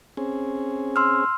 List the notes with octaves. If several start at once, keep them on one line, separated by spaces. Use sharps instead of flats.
C4 C#4 G#4
C6 E6 F6